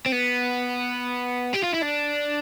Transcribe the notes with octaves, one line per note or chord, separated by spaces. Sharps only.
C4
B3
G4
F4
E4
D4